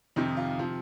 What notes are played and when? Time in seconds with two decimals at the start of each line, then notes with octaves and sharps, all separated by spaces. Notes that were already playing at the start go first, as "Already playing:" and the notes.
0.16 F2 C3 D#3 D#4
0.37 F4
0.59 C3 F3